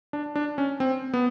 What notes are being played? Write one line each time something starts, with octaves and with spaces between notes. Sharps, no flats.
D4
D4
C#4
C4
B3